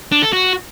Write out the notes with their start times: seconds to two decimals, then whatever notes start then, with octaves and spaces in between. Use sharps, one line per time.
0.12 D4
0.22 A4
0.33 F#4